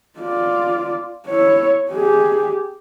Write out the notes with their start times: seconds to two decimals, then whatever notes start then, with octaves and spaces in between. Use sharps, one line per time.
0.19 F4 D5
1.27 E4 C#5
1.92 G4 G#4